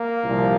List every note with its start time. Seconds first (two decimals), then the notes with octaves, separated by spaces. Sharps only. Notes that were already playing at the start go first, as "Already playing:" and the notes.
Already playing: A#3
0.24 C2 A#2 F3